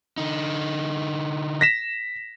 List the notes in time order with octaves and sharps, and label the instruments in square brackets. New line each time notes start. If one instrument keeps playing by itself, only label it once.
[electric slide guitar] D3 D#4
[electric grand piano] A#6 B6 E7